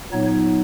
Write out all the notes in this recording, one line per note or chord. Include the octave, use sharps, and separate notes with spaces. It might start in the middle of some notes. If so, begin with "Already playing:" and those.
A#2 F#3 B3 D#4 C#5